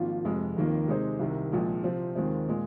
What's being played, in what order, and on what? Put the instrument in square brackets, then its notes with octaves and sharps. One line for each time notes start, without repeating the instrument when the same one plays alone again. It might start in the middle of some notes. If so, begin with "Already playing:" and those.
Already playing: [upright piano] G#1 G#2 F3 A#3 F4
F1 F2 C3 G#3
F1 D#2 D#3 A#3 F4
C3 G#3 D#4 G#4 C5
C2 C3 D#3
A#1 A#2 F3 G#3
C3 F3 C4
D#2 D#3 G#3 C4 F4
A#2 G#3